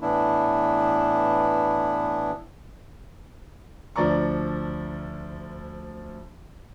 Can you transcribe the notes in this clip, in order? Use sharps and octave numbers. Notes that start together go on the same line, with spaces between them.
A2 E3 B3 D4 E4
D2 F3 D4 D5 A#5 C#6